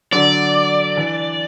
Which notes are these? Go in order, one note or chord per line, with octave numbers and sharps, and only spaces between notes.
D3 F#3 D4 D5
E3 D4